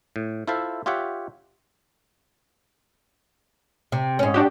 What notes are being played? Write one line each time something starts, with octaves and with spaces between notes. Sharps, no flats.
A2
E4 F4 A4 C5 E5 F5
F4 G4 C#5 E5 F#5
C3
G#2 C#4
D4 F#4 G4